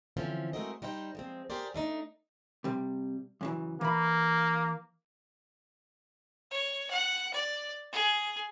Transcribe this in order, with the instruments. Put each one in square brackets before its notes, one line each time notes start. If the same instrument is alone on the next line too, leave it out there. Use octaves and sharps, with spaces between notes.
[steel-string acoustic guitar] D3 E3 F3 C4 C#4
G#3 A3 C4 F#4 A#4 D#5
G3 D#4 C5 F5 G5
F3 G#3 C4
G4 G#4 A#4 C5 D5
A3 D4 D#4
[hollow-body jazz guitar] C3 G3
F#2 C#3 E3
[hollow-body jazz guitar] E3 B5 [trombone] A#3
[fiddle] C#5
F#5
D5
G#4